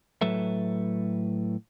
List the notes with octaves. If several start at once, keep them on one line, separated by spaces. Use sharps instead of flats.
A2 F#3 A4 B4 E5